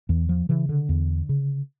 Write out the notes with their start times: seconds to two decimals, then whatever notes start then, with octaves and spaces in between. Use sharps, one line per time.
0.09 E2 E3
0.29 F3
0.49 C#3 E3
0.69 D3
0.89 E2
1.29 C#3